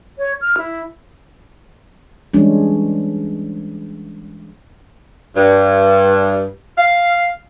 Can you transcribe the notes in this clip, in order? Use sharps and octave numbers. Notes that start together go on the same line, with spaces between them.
C#5
F6
E4
E3 G3 G#3 C#4 D4
G2
F5